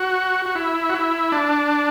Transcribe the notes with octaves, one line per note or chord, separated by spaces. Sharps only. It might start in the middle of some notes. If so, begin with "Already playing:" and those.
Already playing: F#4
F#4
E4
F#4
E4
D4